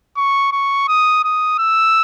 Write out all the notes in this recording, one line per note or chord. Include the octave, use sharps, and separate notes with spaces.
C#6
C#6
D#6
D#6
E6